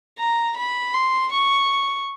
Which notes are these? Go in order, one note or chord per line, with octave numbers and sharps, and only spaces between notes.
A#5
B5
C6
C#6